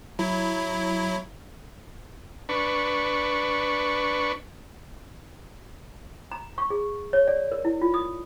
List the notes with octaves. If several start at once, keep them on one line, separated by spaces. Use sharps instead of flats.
F#3 E4
D4 B4 C#6
A#5
C#6
G#4
C#5
D5
A#4
E4
F4
D#6